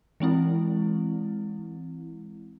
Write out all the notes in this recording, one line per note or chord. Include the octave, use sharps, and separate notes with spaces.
E3 G#3 C4 E4